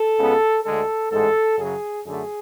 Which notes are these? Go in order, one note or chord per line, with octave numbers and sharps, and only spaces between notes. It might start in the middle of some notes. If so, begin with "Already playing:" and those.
Already playing: A4
C#2 C#3 G#3 B3
D2 D3 G#3 A4
A1 G#2 G#3 A4
F#2 C#3 F#3 G#4
F#2 D3 A3 G#4